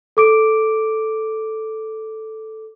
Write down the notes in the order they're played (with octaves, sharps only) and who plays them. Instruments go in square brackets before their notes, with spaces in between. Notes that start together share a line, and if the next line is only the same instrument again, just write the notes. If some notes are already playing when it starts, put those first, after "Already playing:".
[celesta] A4 D6 D7